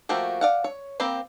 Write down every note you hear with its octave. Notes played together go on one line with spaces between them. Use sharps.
F3 A3 A#3 F#4 G4
D5 F5 F#5
C#5
A#3 C4 G4 B5